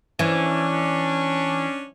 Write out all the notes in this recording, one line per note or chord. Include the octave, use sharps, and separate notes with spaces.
E3 C#4 D4